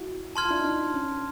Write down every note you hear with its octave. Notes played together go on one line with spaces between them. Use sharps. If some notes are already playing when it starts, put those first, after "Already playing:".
Already playing: E4 F#4
A5 C6 F6 G#6
F4
D4 E4
D#4
D4
C#4